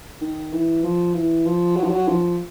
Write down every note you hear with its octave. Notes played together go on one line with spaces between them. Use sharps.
D#3
E3
F3
E3
F3
F#3
F3
F#3
F3